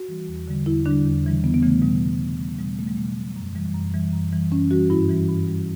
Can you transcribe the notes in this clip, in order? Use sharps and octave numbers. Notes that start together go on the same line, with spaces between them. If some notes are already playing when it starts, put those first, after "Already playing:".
Already playing: F#4
E3 G3
E2
D3 G3
E2 E4
D3 G3 D4
E2
C#3 E3 G3
E2 B3
B3
C#3 E3 G3 A3
B2 G3
G3
B2
G3
B2 G3
F#3 A3
G3
B2 A3
F#3
F#2
E3 G3
F#2
E3 G3
F#2
E3 G3
F#2 C#4
E3 G3 F#4
G2 E4
E3 G3
G2
E3 G3